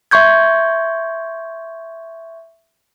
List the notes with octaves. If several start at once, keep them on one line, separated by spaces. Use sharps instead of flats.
E5 C6 C#6 G6 G#6